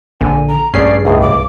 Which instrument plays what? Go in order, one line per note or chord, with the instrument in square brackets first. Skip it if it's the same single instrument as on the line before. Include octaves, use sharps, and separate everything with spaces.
[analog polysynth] A#1 [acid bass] D3 [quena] G#5
[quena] A#5
[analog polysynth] A#1 G#4 C7 [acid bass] G2 [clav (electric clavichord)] A3 C#4 [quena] D5
[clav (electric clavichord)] C#2 A2 [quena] G#4
[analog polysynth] C2 [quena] D6